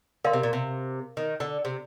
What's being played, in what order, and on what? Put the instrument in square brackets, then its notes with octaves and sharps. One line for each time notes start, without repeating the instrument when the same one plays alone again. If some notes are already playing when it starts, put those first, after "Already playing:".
[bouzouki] D3 [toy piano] A#4 F5 C6
[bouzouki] C3
A#2
C3
D#3
D3
C3